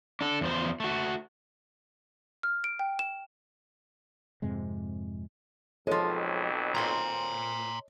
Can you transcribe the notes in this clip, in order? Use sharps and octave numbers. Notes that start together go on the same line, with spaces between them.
D4 A4
E2 F3 C5
A3 F#4
F6
D7
G5
E7
F2 G#2 C3 G#3
B1 F2 F3 G#3 A4 C#5 D#5
A#2 C4 A#5 C6